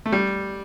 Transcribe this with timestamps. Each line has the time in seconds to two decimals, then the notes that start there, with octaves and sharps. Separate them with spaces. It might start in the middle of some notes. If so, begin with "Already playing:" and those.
0.06 A3
0.12 G3